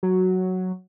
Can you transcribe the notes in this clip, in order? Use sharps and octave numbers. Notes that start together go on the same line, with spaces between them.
F#3